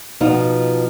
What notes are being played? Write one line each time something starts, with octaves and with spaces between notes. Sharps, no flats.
B2 F3 D#4